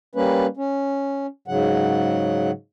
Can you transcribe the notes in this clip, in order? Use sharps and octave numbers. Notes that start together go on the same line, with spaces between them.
G3 A#3 C#4 B4
C#4
G#2 C#3 F#3 F#5